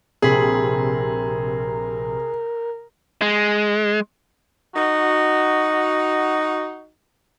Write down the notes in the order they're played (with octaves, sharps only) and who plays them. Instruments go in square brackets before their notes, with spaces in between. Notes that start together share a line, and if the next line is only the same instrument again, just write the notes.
[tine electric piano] A#1 B5 [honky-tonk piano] C3 [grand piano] G#4 [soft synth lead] A#4
[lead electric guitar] G#3
[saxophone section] D#4 F#4